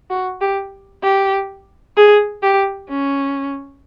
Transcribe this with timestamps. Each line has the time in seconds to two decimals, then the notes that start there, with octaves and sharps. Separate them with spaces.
0.10 F#4
0.41 G4
1.03 G4
1.97 G#4
2.43 G4
2.89 C#4